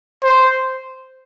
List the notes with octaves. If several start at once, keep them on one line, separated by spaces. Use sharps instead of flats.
C5